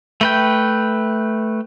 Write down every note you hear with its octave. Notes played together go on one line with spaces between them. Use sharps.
A3 B4 G5